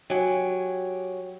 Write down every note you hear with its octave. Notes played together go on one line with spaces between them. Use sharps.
F#3 G4 G#5